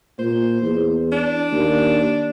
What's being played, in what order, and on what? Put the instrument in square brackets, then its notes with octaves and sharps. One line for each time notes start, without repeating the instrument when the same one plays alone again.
[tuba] A#2 [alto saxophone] C5
[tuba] E2
[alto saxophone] D4
[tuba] D#2